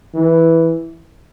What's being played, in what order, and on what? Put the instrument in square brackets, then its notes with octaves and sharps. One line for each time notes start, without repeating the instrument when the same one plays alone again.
[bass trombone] E3